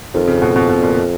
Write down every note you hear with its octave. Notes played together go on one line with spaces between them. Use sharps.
F2 D#3
C#3
B2
B2
B2
A#2